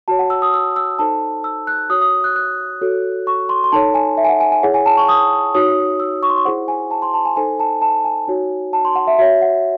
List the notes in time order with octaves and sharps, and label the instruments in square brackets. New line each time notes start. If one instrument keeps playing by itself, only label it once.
[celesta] F#4 C#5 A5
F#5
E6
D#6
E6
E6
D#4 A4 C5 A5
E6
F#6
F#4 C#5 D#6
D#6
F#6
F#6
F#4 A4 C#5
C#6
C6
C6
D#4 A4 C#5 A5
G#5
E5
G#5
F#5
G#5
G#5
E4 G#4 C#5 F#5
G#5
A5
C#6
D#6
D#4 F#4 C#5 D#6
E6
C#6
C6
C#6
E4 G#4 C5 F#5
G#5
A5
C6
A5
G#5
D#4 A4 C5 G#5
A5
A5
G#5
D#4 F#4 C#5
A5
C6
F#5
E5
F#4 C#5 E5
F#5